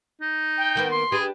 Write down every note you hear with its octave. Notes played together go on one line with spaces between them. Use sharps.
D#4
G5
D#3 A#3 B3
C6
D4 G4 G#4 B4